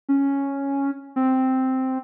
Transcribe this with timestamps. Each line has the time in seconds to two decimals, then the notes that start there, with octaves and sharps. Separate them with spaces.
0.09 C#4
1.16 C4